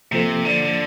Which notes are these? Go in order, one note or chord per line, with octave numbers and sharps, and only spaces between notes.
C3 F3 A#3 F4 A4 C5
D3